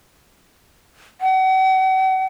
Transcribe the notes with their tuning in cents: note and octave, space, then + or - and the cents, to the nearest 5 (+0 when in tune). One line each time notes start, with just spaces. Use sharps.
F#5 +40